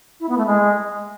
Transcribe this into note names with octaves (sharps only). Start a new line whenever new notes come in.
E4
B3
A3
G#3